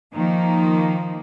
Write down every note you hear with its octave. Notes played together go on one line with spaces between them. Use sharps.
D#3 F3 A#3 D#4